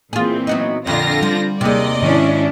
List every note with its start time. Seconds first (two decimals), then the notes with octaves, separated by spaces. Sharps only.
0.13 A#2 E3 C4 F4 G#4
0.47 F#3 B3 D#4
0.87 F2 A#2 D3 F4 A#6
1.22 F3 G3
1.61 D#2 C3 G#4 D5 D#5
2.02 G#2 D#3 C#4 D4 E4